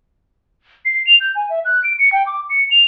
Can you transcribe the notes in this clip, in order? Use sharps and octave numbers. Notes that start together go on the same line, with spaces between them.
C7
F7
G6
G#5
E5
F#6
D7
C#7
G5
D6
C#7
F7